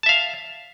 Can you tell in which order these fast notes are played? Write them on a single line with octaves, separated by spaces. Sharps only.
A5 E5 F5